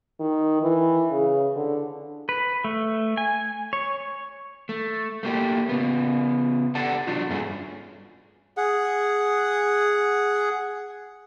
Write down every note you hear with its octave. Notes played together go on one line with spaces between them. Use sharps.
D#3
E3
C#3
D3
B4
A3
G#5
C#5
A3
A3 A#3 G4
C#3 B3
G4 A4 D5 F#5 A5
F#3 D4 F4
G2 A3 C#4 G#4
G#4 F#5